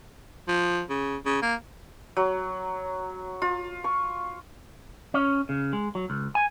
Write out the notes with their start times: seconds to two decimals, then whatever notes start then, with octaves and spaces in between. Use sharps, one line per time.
0.48 F3
0.89 C#3
1.26 C#3
1.42 A#3
2.17 F#3
3.42 F4
3.84 C#6
5.14 C#4
5.49 C#3
5.73 G#3
5.95 F#3
6.10 C#2
6.35 G#5